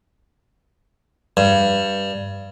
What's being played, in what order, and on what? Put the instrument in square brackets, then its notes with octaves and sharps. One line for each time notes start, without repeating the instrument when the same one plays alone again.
[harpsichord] G2